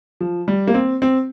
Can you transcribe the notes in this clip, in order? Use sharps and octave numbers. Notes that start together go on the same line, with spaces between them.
F3
G3
A#3
C4
C4